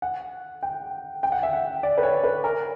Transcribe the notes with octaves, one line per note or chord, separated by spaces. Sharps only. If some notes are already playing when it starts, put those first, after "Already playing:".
F#5
G5
G5
F#5
E5
F#5
D5
B4
C#5
B4
A#4